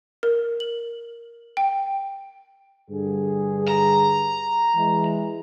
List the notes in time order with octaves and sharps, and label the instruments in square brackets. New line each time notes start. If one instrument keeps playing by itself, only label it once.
[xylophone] A#4
F#7
G5
[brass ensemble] G2 D3 G#4
[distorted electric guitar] A#5
[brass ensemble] E3 G#3